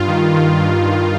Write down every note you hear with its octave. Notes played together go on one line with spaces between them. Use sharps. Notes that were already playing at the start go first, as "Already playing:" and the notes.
Already playing: G2 F4
D#3
D#3
G2
G2